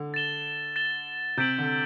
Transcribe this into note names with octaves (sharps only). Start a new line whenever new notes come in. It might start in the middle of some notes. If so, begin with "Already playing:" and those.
Already playing: D3
A6 E7 G7
A6 E7 G7
C3 G6 B6 D7 F#7
D3